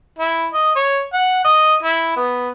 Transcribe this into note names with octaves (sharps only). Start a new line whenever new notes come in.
E4
D#5
C#5
F#5
D#5
E4
B3